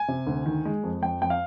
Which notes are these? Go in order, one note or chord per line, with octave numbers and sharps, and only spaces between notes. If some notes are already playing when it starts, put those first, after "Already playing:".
Already playing: G#5
C3
D2
D#3
G#3
F2
F2 G5
F2 G5
F5